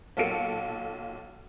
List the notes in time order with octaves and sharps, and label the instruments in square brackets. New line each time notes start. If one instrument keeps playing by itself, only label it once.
[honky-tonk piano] B1 A#2 A4 F5 C#7 D7